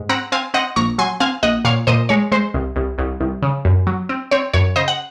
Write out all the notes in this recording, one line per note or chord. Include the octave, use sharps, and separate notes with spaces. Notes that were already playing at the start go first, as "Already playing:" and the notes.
Already playing: G#2
C4 F#5 A#5
C4 F5 G#5
C4 D#5 F#5
A#1 A#5 C#6
F#3 G#5 C6
C4 F5 G#5
A#1 D#5 F#5
A#2 C#5 F5
A#2 C5 D#5
G#3 C#5
G#3 C5
C2
C2
C2
C2
C#3
F#2
F#3
C4
C4 C#5
F#2 C#5
C#3 C5 D#5
F#5